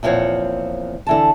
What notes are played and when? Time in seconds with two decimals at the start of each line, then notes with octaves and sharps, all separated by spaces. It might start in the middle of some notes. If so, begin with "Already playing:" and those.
0.03 E2 A#2 F3 C4 C#5 F#5
1.07 D3 E3 A5